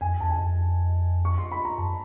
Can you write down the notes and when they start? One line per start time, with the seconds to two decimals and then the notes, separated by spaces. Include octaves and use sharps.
0.01 F2 G#5
0.20 E2 A5
0.30 G#5
0.36 F#2
0.40 F2
1.25 C#6
1.38 C6
1.52 B5
1.65 A#5
1.78 F#2 A5